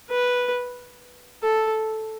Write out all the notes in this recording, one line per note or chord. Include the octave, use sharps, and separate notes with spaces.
B4
A4